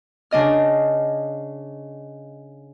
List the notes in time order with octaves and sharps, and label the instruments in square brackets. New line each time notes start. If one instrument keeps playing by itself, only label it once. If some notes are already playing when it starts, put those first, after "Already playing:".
[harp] C#3 D4 D#5 F6